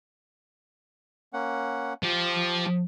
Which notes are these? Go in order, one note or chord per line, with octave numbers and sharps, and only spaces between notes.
A#3 C#4 F#5
F3 G4 A5